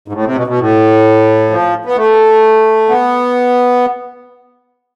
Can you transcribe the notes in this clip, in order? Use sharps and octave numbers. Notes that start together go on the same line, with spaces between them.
G#2
A2
C3
B2
B2
A2
F3
B3
A3
B3